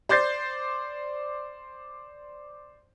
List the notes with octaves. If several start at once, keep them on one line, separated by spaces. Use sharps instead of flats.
C5 D5 G6 A6 C7